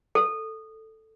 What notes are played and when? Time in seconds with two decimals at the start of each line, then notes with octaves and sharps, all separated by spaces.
0.15 A4